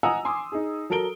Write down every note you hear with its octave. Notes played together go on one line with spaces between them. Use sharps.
D#5 F#5 G#5 A#5 D#6 E6
G#5 C6 D6 D#6
D#4 G#4
F#3 A4 A#4 D7 G7